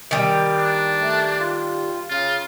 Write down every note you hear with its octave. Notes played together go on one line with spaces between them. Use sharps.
D#3 G3 D6
D4
A3
F4
C#3 F4